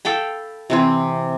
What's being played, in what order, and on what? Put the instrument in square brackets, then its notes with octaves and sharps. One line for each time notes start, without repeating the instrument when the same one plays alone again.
[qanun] A4 F5 G5 B5
C3 E3 C4